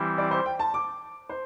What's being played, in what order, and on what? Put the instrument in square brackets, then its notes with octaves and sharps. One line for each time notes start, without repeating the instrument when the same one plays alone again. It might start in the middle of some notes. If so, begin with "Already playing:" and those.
Already playing: [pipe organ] E3 G3 C4 E4 G4
[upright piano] D5
C5
G5
A5
D6
C5